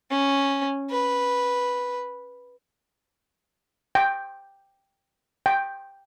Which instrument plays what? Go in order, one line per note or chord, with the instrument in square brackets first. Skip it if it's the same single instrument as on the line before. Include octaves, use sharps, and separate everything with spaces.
[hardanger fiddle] C#4
B4
[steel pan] G5
G5